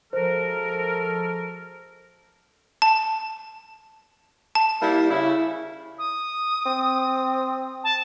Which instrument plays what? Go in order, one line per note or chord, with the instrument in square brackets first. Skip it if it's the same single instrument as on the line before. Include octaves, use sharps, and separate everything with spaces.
[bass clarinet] F3 [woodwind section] G#3 F#4 A#4 [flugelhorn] A4 [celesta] C5
[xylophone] A5
A5
[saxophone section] G3 A#3 E4
C#3 E4
[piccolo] D#6
[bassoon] C4
[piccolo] A5